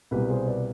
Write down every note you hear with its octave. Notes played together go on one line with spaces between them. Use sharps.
C2 B2 G3 G4 B4
G#4 C5
B4 D5